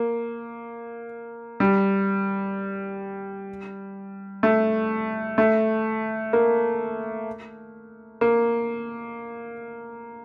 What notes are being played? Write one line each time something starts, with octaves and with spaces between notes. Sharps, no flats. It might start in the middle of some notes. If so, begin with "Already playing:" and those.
Already playing: A#3
G3
A3
A3
A#3
A#3